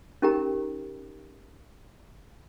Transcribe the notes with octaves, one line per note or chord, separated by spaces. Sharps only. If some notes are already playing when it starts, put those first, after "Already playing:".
C#4 D#4 G4 A#4 G5 A#5